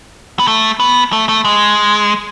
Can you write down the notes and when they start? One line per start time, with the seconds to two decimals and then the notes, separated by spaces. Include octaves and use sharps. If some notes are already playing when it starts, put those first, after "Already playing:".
0.39 B3
0.47 A3
0.80 B3
1.13 A3
1.29 A3
1.45 G#3